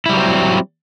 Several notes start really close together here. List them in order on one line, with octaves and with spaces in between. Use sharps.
E4 G3 F#3 C4